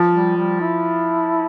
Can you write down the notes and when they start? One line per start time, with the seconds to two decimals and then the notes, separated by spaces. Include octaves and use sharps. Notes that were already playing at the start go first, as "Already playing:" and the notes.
Already playing: F3
0.13 G3
0.37 G3
0.60 E4